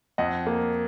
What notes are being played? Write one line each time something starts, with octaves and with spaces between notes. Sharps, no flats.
F2 D#5 F#5
A#3